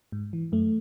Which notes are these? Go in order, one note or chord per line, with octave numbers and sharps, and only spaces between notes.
G#2
E3
F#2 A3